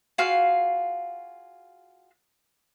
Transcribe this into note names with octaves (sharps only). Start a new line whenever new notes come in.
F4 F#4 G#4 F5